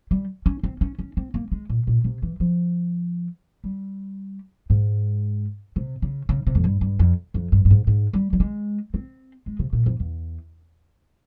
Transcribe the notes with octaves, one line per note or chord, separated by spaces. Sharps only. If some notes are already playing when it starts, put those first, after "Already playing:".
G3
C#4
C4
C#4
C#4
C4
A#3
G#3
A#2
A#2
C3
E3
F3
G3
G#2
C3
C#3
C#3
C3
F2
G2
G2
F2
F2
G2
G2
G#2
G#2
G3
G3
G#3
C4
G#3
C3
A#2
F2
E2